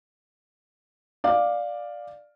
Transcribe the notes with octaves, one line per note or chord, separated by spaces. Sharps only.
D5 F5